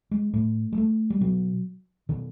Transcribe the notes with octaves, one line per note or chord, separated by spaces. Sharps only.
G#3
A2 A3
G#3
A3
G3
B2 F#3
B2 D#3